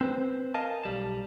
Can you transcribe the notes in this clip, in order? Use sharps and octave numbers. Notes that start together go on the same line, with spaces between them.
C4 B4 C5
A#4 D#5 F5 G#5 A5
B1 G3 A5